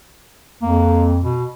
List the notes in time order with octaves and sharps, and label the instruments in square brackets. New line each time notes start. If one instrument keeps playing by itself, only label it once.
[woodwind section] F2 [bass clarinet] A#3
[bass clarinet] B2